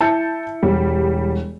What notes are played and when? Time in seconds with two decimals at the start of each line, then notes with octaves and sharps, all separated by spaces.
0.01 E4 A5 G6 C#7
0.63 E1 G3